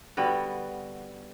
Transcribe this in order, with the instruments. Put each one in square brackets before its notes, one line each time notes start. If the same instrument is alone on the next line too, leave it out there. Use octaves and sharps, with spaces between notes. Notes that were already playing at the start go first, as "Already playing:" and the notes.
[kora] D3 G3 B3 F#4